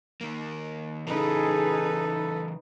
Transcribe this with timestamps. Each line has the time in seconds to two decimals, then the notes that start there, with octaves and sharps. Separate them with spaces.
0.21 D#3 A#3
1.07 C#3 E3 D#4 G#4 A4 B4